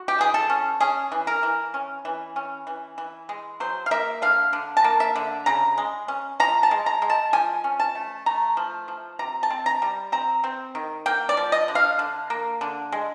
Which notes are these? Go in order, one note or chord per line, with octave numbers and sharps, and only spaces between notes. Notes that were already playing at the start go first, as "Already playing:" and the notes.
Already playing: F#4
G4
E3 G#4
A4
C#4
C#4 G#4
E3
A#4
E3
C#4
E3
C#4
E3
E3
G#3
F#3 C5
F5
A#3 E5
D3 F5
D3
A5
A#3
E5
D3
C#3 A#5
G#3
C#4
F3 A#5
A5
G#3
A#5
G#3
A5
F3 G#5
C#4
A5
A3
A3 A#5
F3
F3
C3 A#5
A5
C4
A#5
G3
C4 A#5
C4
D#3
A#3 G5
D5
F3
D#5
D3
F5
D3
A#3
D3
G#3